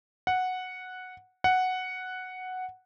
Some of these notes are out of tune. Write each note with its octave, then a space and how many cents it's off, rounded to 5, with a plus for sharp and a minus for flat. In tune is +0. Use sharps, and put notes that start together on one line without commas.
F#5 -5
F#5 +0